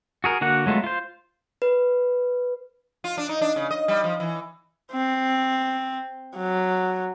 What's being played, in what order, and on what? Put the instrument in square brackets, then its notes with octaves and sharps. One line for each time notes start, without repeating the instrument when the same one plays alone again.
[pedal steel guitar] F#4 G#4 A#4
D3 A#3 F#4 F#5
F#3 G#3 A3 B3 F4
F4 C5
[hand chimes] B4
[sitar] F4
D4
D#4
D4
C#3
D#5
G3
F3
E3
[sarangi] C4
F#3